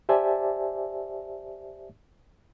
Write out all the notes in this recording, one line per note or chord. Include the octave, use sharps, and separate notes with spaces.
G4 C5 D5 E5 G#5 A5